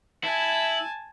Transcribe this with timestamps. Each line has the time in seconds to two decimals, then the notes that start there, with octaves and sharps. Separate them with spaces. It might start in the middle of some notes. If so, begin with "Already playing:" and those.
0.24 E4 G#5 A5